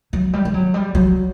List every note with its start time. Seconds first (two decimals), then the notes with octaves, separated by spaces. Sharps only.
0.13 F#3
0.33 G3
0.45 G3
0.54 F#3
0.74 G3
0.95 F#3